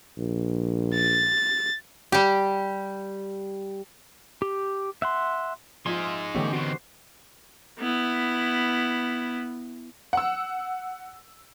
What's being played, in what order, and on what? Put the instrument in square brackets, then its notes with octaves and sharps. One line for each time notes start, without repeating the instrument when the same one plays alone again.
[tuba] A#1
[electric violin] A6
[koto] G3 G4
[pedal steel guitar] G4
E5 F#5 C6
[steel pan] F3 F4 [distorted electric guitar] D#4 G#4 [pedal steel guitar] E5 G#5 C6
[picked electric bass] D3 E3 B3 [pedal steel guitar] A3 C#5 [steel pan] C#4 G4
[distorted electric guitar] C3 D#3 [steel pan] F#4 [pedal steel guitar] C5
[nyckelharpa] B3 E4
[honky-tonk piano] F#5 E6